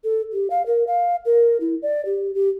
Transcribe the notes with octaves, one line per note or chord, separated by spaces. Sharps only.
A4
G4
F5
A#4
F5
A#4
E4
D5
G4
G4